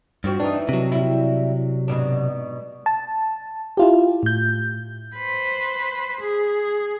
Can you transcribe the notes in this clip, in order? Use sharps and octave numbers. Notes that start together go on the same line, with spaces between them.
G2 F3 C4 F#4
E3 D4 D#4
C3 F#3
G3 E4
G#2 B2 D4
A5
E4 F4 G4
A2 G6
B4 C5
G#4